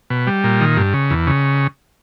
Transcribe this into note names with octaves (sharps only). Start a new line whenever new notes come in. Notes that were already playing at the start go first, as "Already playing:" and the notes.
B2
G3
A#2
D#3
G2
C#3
E2
C#3